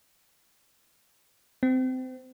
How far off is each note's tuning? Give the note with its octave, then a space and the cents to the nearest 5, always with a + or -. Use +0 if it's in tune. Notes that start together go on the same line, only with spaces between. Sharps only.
C4 -25